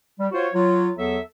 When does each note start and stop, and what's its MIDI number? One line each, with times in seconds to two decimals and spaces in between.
0.18 0.26 55
0.32 0.47 65
0.32 0.47 66
0.32 0.47 72
0.32 0.47 73
0.52 0.89 54
0.52 0.89 65
0.96 1.18 40
0.96 1.18 54
0.96 1.18 59
0.96 1.18 69
0.96 1.18 76